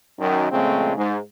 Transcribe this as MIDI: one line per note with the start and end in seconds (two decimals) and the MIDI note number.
0.20 0.50 42
0.20 0.50 51
0.51 0.92 41
0.51 0.92 46
0.51 0.92 49
0.51 0.92 56
0.51 0.92 57
0.51 0.92 60
0.96 1.19 44